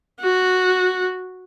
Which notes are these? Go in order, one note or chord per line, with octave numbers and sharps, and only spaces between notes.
F#4